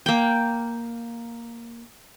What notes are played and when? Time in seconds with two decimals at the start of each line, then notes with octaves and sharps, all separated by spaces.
0.06 A#3 G5